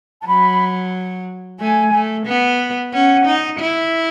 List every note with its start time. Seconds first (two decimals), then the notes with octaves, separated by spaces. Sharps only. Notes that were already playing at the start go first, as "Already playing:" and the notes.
0.21 A5
0.26 F#3 B5
1.59 A3 G#5
1.93 A3
2.27 B3
2.93 C#4 F#5
3.26 D#4
3.60 E4